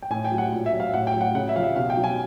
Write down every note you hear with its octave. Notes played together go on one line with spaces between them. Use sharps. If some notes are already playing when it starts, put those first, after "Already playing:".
G5
A2 G#5
G5
F#3
F#5
A#2
E5
F#3
F5
A2 F#5
G5
F#3
F#5
C#3 F#5
E5
F3 F5
E5
B2 F5
G5
F#3
G#5